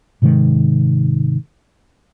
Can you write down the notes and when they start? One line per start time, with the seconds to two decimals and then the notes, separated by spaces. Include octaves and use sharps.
0.22 G#2 C3 D#3 G#3